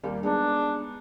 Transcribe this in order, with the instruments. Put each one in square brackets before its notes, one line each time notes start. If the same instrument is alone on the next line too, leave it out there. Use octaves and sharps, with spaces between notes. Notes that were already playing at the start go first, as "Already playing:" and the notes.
[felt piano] D#2 G3 A#3
[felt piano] G#3 B3 D#4 [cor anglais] D4